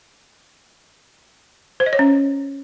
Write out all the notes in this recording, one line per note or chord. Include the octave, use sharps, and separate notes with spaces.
C5
D#5
C#5
C#4